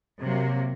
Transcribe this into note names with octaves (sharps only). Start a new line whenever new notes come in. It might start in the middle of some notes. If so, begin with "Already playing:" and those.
C3 F#3 A#3